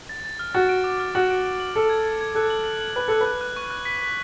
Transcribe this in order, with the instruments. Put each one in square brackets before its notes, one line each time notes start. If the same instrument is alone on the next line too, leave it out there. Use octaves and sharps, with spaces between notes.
[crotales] A6
A6
F6
[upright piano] F#4 [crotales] A6
[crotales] D7
D6
F6
[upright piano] F#4 [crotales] F#7
[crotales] D7
D7
F#7
[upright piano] A4 [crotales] D7
[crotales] G#6
G#6
G#6
[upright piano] A4 [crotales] F#6
[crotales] F#7
F#7
F#7
[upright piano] B4 [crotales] F#6
[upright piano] A4 [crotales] F#6
[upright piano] B4 [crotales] F#6
[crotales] F#6
C#6
F#6
B6
B6